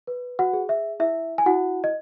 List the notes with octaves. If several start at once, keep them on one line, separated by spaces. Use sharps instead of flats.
B4
F#4 F#5
G#4
E5
E4 E5
G#5
E4 F#4 F#5
D#5